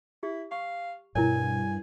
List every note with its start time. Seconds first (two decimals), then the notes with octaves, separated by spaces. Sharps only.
0.23 E4 G4
0.52 F5 C#6
1.15 G2 B2 B3 E4 A#4 C#5 G#5